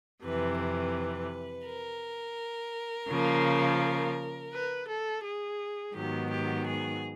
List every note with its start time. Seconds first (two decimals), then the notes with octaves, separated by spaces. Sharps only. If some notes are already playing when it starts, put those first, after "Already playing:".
0.24 F2 C3 E3 B4
0.60 B4
1.66 A#4
3.09 C#3 F3 A#3
4.52 B4
4.87 A4
5.23 G#4
5.94 G#2 D#3 F#3 B3 G4
6.30 G4
6.66 G#4